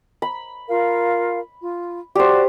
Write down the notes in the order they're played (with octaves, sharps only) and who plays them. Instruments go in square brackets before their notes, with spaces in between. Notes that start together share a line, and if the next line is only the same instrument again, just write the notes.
[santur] B5
[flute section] F4 A#4 F5
F4
[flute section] F#4 D5 [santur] G4 C5